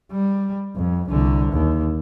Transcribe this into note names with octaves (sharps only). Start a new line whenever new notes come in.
G3
F2
C2 D3
D#2